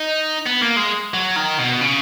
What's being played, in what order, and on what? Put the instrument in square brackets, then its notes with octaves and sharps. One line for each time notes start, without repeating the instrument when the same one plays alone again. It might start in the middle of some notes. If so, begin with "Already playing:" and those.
Already playing: [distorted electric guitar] D#4
B3
A#3
G#3
F#3
D#3
B2
C#3